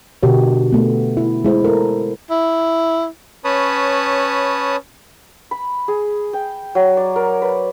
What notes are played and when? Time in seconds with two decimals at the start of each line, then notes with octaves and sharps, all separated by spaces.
0.23 B2 D3 F#4 G4 A#4 C#5
0.72 B2 A3 B3
1.17 E4
1.45 G#3 E4 C5
1.64 E4 A4 A#4
2.31 E4
3.44 C#4 B4 C#5 A5 B5 D#6
5.51 B5
5.88 G#4
6.33 G5
6.75 F#3
6.97 D5
7.16 A#4
7.42 B4